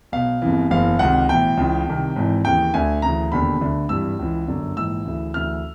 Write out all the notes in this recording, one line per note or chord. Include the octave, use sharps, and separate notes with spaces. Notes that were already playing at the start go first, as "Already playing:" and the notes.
B1 B2 F5
G1 F2 C#3 E3
F#1 E2 C#3 E3 F5
C#2 C3 D#3 F#5
B1 A2 E3 G5
C#2 C#3 E3
C2 C3 D#3
G#1 G#2 E3
D#2 C#3 E3 G5
D2 D3 G#5
D2 C#3 E3 A#5
E1 D#2 D3 B5
D2 D3
G#1 G2 E3 E6
C#2 C#3 E3
G1 F#2 D3
A#1 G#2 E3 E6
D2 C#3 E3
D2 C#3 E3 F6